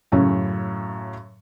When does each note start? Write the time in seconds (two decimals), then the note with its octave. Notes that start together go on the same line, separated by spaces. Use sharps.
0.12 F#2 A2 C#3 C#4